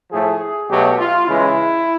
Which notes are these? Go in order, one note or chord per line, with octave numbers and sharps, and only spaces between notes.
A2 F3 A3 G#4
B2 F#3 A3 G4
F4
C#3 E3 G#3 E4